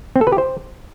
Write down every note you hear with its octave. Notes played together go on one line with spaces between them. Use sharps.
C4
A4
B4
G4
C5